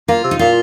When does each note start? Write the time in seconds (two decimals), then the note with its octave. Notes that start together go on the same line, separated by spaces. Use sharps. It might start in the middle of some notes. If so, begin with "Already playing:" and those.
0.08 A#3 F4
0.24 C3
0.31 D#4
0.39 A#2 F4